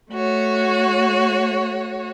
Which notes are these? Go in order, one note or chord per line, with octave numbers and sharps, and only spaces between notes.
A3 F#4 C#5